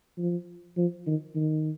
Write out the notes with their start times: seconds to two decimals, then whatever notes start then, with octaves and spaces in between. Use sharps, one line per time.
0.18 F3
0.77 F3
1.07 D#3
1.35 D#3